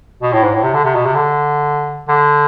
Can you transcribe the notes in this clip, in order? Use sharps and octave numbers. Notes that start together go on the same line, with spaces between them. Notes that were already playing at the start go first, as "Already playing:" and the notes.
B2
A2
G#2
A2
C3
D3
C3
B2
C3
D3
D3